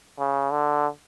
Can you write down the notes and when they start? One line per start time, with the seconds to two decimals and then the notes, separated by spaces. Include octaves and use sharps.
0.19 C#3
0.52 D3